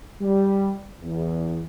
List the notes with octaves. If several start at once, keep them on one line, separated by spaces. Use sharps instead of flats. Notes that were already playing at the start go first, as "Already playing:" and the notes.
G3
E2